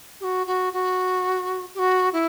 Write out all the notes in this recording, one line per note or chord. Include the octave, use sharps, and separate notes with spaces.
G4
F#4
F#4
F#4
G4
F#4
E4